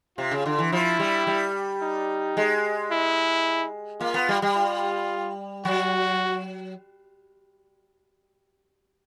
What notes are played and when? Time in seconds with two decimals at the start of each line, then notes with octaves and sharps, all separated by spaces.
0.18 C3 F4
0.31 C#3
0.46 D3
0.59 E3
0.72 F3 E4
1.00 G3
1.27 G3
1.82 D#4
2.37 G#3
2.91 E4
4.00 A#3 F4
4.14 B3
4.29 G3
4.42 G3
4.55 F4
5.65 F#3 F#4